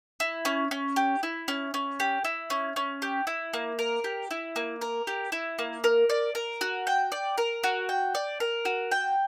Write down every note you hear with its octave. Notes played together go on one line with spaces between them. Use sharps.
E4
C#4
C#4
G4
E4
C#4
C#4
G4
E4
C#4
C#4
G4
E4
A#3
A#4
G4
E4
A#3
A#4
G4
E4
A#3
A#4
D5
A#4
F#4
G5
D5
A#4
F#4
G5
D5
A#4
F#4
G5